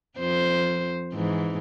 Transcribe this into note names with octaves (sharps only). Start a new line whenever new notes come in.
F2 C5
G#2 E3